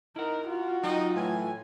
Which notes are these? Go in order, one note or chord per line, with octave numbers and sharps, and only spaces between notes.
D#4 E4 A#4 F#5
F4 F#4
F#3 D#4 F4 D#5 G5
A2 E3 G#5